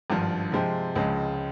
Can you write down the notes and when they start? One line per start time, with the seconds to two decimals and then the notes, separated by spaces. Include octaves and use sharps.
0.10 G#1 G2 F3
0.52 C3 F3 G#3 C4
0.95 C#2 C#3 F3 G#3